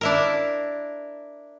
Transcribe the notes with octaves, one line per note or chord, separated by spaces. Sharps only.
D4 E4 A#4